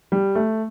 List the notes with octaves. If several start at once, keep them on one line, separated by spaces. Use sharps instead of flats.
G3
A3